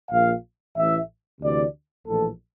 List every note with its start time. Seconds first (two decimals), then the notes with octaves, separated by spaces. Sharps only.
0.10 A#1 A#2 F5
0.75 A1 A2 E3 E5
1.40 D2 C3 E3 D5
2.05 A#1 A2 E3 A4